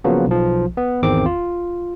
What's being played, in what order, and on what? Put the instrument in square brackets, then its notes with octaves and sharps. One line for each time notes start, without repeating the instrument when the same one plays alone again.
[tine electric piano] C#3 F3 F#3 A#3 B3
B1 F3
B3
G#1 E2 D#3 C4 D6
F4